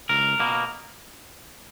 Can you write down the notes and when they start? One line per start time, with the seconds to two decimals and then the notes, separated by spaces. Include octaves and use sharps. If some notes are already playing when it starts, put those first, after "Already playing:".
0.09 C#2 A#4
0.40 B2 A#3